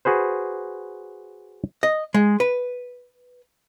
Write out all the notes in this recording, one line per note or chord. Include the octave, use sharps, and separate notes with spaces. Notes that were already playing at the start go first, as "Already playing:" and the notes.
F#4 G#4 B4 C5
D#5
G#3
B4